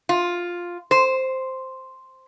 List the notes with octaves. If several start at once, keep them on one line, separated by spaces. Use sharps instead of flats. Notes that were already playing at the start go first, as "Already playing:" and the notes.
F4
C5